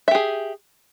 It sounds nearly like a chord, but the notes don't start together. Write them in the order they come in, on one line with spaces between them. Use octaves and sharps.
E5 G4 G#4